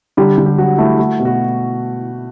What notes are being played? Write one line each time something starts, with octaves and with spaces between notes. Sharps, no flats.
D3 G3 G4
D3
G4
F#3 F#4
A3 E4
A3 F#4
B2
F#4